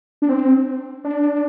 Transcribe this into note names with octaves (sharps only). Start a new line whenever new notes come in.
D4
C4
D4